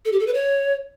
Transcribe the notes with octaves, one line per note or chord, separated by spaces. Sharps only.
A4
G4
A4
B4
C#5